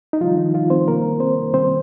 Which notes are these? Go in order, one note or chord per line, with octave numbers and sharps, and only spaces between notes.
D#4
C3 D#3 F3 G3 F4
D#3 D#4
F3 F4
C4 C5
C3 D#3 G3 A#3 A#4
C4 C5
C3 D#3 G3 C4 C5